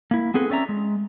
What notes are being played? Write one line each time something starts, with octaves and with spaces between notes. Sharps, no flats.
A#3 E4
B3 C4 G#4 A4 B4
C4 C#4 D5 E5 A#5
G#3